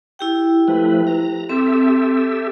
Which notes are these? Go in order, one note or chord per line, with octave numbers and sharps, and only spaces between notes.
E4 G4 G5
F3 A3 B4
A#5
C4 G4 A4 E5